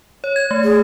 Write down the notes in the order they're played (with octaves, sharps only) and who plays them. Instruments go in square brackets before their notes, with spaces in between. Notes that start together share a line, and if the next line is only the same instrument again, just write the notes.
[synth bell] C#5
G#6
A3
[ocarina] G#4